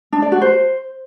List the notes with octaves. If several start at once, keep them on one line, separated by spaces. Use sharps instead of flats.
D4
D5
F#4
C5